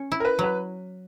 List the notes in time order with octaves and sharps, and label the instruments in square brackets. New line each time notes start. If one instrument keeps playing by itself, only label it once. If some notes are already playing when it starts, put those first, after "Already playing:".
Already playing: [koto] C#4
E4
[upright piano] A#4
B4
[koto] F#3 [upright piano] B4